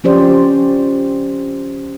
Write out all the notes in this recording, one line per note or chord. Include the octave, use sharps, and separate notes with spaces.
F3 C#4 G4 C5 D5